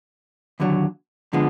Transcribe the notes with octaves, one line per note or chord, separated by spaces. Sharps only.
D#2 D3 F#3
D3 F3 G#3 B3